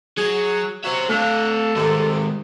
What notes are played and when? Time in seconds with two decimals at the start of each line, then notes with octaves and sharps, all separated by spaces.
0.17 F#3 G#4
0.84 F#3 C5 E5
1.09 A3 D4 A4 F5
1.76 C3 D#3 G#3